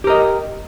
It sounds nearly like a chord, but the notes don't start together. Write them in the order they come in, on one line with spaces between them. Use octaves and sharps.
G4 A#4 D#5